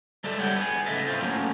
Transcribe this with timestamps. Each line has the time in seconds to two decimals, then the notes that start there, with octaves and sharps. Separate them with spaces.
0.24 G#3 A4 D5 E5
0.39 G3 C#5 D5 F#5 G5
0.56 B3 G#4
0.86 C#3 A3 A4 D#5 E5 A5
1.06 A2 C4 F4
1.21 F#3 A3 A#3 C#4